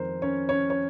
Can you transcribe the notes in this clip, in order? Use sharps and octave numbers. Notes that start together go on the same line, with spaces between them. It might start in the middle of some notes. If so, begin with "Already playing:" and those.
Already playing: F2 D#3 G#3 A#4 C5
C#4 C#5
C#4 C#5
C#5